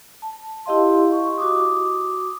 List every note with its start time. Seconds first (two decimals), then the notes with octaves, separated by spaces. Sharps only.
0.22 A5
0.66 E4 G4 D#5 F5 C6
1.12 C#6
1.38 F#4 D6 D#6